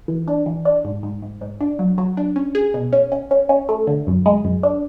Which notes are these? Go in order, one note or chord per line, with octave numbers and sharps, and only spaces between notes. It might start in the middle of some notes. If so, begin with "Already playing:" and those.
E3
D4
E3
D4
G#2
G#2
G#2
G#2
D4
F#3
F#3
D4
C#4
G#4
B2
C#4
C#4
C#4
C#4
A3
D3
F#2
G#3
F#2
D4